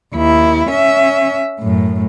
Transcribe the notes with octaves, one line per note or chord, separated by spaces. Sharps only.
D#2 E4
C#4 E5
F#2 A2